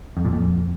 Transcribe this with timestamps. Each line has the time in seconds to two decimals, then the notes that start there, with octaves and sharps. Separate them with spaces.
0.17 F2
0.25 A#2
0.33 F2